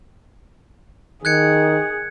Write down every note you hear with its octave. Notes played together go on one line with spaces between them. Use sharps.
D#3 G#4 F#6 G#6 C#7